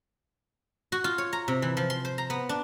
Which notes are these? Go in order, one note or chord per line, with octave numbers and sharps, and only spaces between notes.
F#4
F4
C#5
A#5
C3
E3
F3
C6
C5
A#5
B3
D4